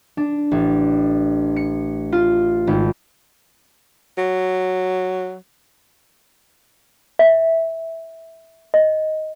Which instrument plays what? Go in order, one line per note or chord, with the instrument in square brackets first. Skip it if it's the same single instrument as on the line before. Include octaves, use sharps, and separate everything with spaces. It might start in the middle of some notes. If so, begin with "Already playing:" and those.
[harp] D4
A1
C#7
F4
G#1
[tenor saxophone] F#3
[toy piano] E5
D#5